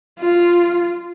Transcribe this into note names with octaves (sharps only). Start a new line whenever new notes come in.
F4